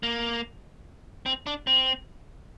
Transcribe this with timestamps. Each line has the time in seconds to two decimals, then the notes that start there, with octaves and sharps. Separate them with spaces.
0.03 A#3
1.26 C4
1.47 D4
1.67 C4